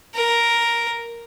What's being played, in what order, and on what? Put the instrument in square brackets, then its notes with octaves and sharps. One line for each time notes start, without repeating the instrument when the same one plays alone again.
[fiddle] A#4